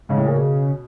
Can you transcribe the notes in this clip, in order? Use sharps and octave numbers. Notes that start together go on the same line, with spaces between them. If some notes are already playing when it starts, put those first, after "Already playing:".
G#2 C#3
A2
A#2
B2